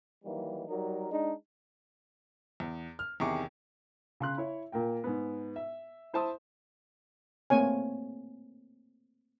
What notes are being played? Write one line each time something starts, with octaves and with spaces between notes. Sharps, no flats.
D#3 E3 F#3 G3 A#3 D#4
F#3 G3 D#4 A#4
G#3 D4 D#4
E2
F6
E2 C3 D#3 G#4 C#6 D6
C#3 C6 F#6
E4 C#5
A#2 A#3 G5
G#2 B3
E5
E4 C5 E5 A5 C6 D#6
A3 A#3 C4 C#5 G#5